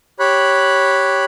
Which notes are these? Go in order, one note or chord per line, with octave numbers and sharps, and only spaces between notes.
G4 C#5 B5 F#6